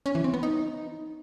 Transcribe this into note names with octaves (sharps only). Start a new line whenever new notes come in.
C#4
E3
C4
B3
D#4